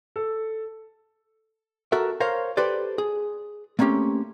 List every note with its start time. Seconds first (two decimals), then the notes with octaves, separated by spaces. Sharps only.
0.16 A4
1.92 F#4 A4 A#4 E5
2.20 A#4 C5 C#5 F5
2.57 G4 A4 B4 C5 D5
2.98 G#4
3.79 A3 A#3 C4 C#4 G4